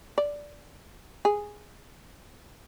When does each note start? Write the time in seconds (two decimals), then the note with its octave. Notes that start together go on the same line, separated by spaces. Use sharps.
0.18 D5
1.25 G#4